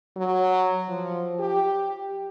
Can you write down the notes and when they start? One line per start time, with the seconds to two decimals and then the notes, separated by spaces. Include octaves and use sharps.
0.16 F#3
0.88 F3
1.40 G4